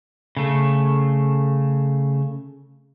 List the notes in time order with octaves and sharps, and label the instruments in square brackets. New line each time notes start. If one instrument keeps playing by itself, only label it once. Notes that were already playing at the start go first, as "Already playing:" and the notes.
[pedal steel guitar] C#3 A3